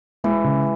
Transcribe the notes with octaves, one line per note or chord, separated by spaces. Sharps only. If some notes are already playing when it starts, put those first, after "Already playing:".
E3 G#3
C#3